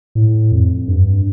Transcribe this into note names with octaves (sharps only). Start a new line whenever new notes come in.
A2
F2
G2